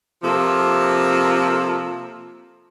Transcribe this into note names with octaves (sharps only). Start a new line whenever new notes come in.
C3 F3 A#3 A4